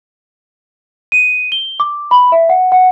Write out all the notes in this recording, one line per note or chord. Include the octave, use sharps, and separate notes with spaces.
D#7
G7
D6
B5
E5
F#5
F#5